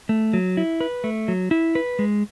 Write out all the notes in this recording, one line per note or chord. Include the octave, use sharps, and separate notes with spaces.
A3
F#3
E4
B4
A3
F#3
E4
B4
G#3